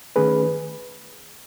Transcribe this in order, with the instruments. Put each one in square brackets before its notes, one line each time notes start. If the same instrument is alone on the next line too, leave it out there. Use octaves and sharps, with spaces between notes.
[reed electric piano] D#3 A3 C#4 G#4 B4